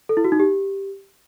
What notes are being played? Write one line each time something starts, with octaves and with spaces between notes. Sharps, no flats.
A4
E4
F#4
D#4
G4